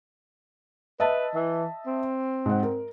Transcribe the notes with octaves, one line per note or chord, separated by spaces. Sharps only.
B4 D#5 E5 A5
E3
C4
G#2 F#5
A#4